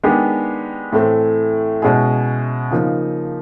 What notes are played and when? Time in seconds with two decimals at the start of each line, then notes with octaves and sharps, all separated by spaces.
0.04 D#3 G#3 B3 D4 G4
0.92 A2 E3 A3 C4
1.82 B2 G#3 C#4 E4 G#4
2.71 C#3 F3 A#3 D#4